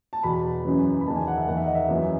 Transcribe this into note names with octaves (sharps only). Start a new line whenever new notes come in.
A5
E2 B2 B5
F#2 C#3 E3
B5
E2 D#3 A5
G#5
F#5
E5
E2 D#3 F#5
E5
D#5
E5
F#2 C#3 E3